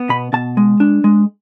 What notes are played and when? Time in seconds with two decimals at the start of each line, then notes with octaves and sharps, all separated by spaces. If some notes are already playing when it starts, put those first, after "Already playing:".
Already playing: B3
0.09 B2 B5
0.33 B2 A5
0.57 G#3
0.80 D4
1.04 G#3